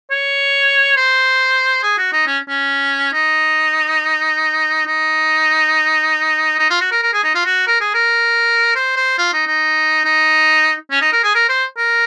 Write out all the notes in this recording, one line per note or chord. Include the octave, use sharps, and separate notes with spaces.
C#5
C5
G#4
F#4
D#4
C#4
C#4
D#4
D#4
D#4
F4
F#4
A#4
A#4
G#4
D#4
F4
F#4
A#4
G#4
A#4
C5
C5
F4
D#4
D#4
D#4
C#4
D#4
A#4
G#4
A#4
C5
A#4